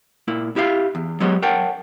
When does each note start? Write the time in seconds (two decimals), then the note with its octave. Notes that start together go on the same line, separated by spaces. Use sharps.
0.28 A#2 A#3 E4
0.56 E4 G4 E5 F5
0.95 E2
1.20 F#3 G#3 B3 G4 C#5 D#5
1.42 A#4 C#5 F#5 G5 A5